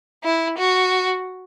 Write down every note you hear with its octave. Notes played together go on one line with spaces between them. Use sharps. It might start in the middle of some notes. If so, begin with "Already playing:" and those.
E4
F#4